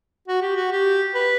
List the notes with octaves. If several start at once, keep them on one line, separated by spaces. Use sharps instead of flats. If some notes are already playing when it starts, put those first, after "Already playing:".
F#4
G4
F#4
G4
B4